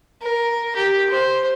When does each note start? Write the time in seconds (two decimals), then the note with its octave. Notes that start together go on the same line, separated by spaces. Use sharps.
0.21 A#4
0.76 G4
1.10 C5